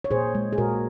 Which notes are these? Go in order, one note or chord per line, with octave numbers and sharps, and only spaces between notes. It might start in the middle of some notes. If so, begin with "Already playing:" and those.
C#5
A#2 G#4 C5
G#3
G#4
A#2 F#4 A#4